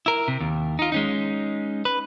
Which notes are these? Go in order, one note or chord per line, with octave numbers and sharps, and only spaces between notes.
E4 A#4
C3
D#2
D#4 F4
G#3 C#4 D#4
B4